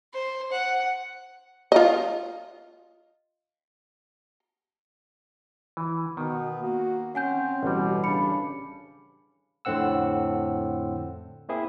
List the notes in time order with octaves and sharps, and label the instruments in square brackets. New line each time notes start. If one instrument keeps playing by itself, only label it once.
[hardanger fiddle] C5
F#5
[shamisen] F4 D#5
[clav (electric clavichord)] E3
[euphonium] B2 [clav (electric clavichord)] D#3 [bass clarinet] B3
[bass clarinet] A#3 [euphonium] F#4
[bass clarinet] C4 [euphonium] C#4 [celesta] F#5 G#5 G6
[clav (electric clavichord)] A1 G3 [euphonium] B2
[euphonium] C#3 [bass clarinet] D4 [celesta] B5 C#7
[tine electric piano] F2 A2 D3 C4 F#5 E6
A#3 C4 E4 G#4